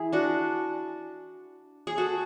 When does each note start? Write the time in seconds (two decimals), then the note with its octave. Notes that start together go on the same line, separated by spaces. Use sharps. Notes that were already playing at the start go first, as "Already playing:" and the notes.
Already playing: E3 E4 G#4
0.13 D4 F#4
1.87 G#4
1.97 F#4 A4